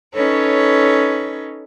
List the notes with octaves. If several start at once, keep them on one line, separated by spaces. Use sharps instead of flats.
C#4 D#4 A4 B4 C#5